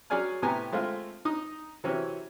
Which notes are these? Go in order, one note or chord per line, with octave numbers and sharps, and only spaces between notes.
F#3 C#4 G#4 D5 G#5 F6
A2 C3 B3 G4 G#5 A#5
G#3 A3 C4 F4
D#4 D#6
C3 E3 F#3 C4 C#4